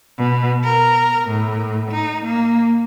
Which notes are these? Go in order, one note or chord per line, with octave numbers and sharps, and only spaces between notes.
B2
A#4
A2
D#4
A#3